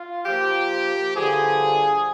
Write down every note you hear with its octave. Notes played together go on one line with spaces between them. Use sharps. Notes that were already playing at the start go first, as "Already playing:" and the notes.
Already playing: F4
A#2 F3 G4
G2 D3 F3 G#4